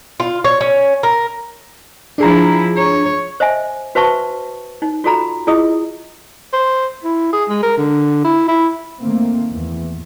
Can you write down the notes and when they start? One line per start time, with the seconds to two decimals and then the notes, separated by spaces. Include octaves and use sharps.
0.20 F4
0.44 C#5
0.61 C#4
1.03 A#4
2.18 F3 D4 E4 G#4 A#5
2.77 C#5
3.40 C5 D#5 E5 G#5
3.95 F#4 B4 C5 E5 A5 C#6
4.82 D#4
5.04 F4 F#4 A4 A#5 B5
5.47 E4 F4 G#4 D#5 D#6
6.53 C5
7.04 E4
7.33 G#4
7.49 G#3
7.63 A#4
7.78 D3
8.24 E4
8.48 E4
9.00 D#3 A3 A#3 C4
9.51 E2 E3